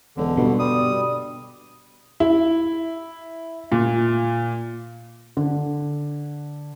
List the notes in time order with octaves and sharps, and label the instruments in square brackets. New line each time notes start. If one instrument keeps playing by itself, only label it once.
[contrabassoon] E1 [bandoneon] D3
[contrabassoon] G2 [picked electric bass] B2
[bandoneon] G3 D#6
[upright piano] E4
A#2
[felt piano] D3